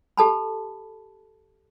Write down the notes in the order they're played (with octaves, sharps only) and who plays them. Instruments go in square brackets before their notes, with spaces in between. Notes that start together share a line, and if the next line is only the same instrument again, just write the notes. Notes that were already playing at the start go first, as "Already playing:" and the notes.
[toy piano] G4 A4 A5 B5